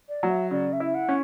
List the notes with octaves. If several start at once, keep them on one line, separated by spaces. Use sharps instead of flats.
D5
F#3
E5
C#3 D5
E5
E4
F#5
C#4